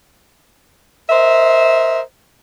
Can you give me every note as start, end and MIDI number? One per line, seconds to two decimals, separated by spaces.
1.09 2.00 70
1.09 2.00 72
1.09 2.00 75
1.09 2.00 76